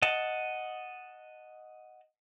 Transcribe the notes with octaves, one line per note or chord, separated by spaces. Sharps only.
D#5 F#5 A5